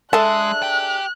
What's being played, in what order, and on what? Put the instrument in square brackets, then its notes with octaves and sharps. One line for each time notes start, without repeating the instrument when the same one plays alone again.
[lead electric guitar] G#3 [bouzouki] D4 G#4 E5 [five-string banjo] A4 A5 [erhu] F#6
[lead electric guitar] G4 G5